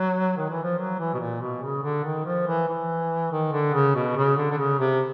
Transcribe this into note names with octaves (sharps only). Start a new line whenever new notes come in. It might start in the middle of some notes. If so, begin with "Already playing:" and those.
Already playing: F#3
D#3
E3
F3
F#3
E3
B2
A#2
B2
C#3
D3
D#3
F3
E3
E3
D#3
D3
C#3
B2
C#3
D3
D3
C#3
C3